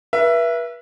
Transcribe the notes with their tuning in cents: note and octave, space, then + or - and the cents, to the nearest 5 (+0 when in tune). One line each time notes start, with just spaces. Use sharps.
B4 -35 E5 +20